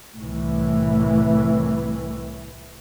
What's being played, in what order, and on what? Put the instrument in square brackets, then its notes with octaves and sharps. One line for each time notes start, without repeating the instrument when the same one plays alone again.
[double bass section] C2 A2 E3